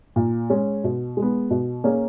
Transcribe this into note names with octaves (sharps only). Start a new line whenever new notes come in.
A#2
G#3 C#4
B2
G#3
B3
B2
A#3 C#4 G#4